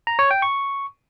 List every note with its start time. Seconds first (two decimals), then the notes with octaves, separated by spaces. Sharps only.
0.07 A#5
0.19 C#5
0.31 G5
0.42 C#6